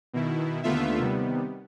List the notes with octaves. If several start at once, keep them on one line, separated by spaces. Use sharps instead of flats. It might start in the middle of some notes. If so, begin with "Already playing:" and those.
B2 D#3 E4
D#2 D3 A3 B3 F4 E5
C3 D#3 G3 B3